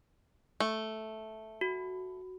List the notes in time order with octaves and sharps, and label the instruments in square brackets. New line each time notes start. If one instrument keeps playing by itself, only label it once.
[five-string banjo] A3
[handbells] F#4